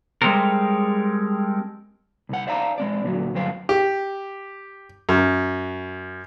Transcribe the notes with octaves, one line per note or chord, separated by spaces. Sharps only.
G3 G#3 C4 A4 A#4
C2 F#5
C5 D5 E5 F5 A5 A#5
G#3 C4 D5
D2 A#2 D#3 F#3
D2 G2 F#3 C5 F5
G4
F#2